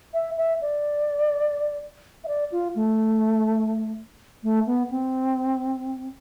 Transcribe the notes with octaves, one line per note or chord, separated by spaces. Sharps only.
E5
E5
D5
E5
D5
F4
A3
A3
B3
C4